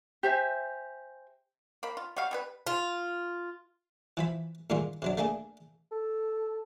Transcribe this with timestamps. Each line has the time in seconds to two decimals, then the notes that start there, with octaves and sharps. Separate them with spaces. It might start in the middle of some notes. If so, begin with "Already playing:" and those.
0.23 G4 C5 E5 G#5
1.83 A#3 B5
1.97 F4
2.16 G3 F#4 G4 F5
2.31 G3 G#4 B4
2.67 F4
4.17 E3 F3 B5
4.70 A#2 D#3 G3 G#3 F4
5.02 C3 F#3 D4
5.18 A3 A#3 D4 G#4 A4
5.92 A4